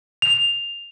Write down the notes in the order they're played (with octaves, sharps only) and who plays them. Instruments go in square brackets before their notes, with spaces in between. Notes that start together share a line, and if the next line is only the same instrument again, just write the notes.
[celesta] F7